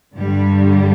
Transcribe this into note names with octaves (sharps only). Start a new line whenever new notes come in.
G2 D3 G3